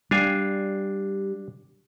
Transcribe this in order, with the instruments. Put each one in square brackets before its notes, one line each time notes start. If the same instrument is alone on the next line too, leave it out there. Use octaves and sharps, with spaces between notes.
[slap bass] G3 [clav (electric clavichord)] D4 F5 G#5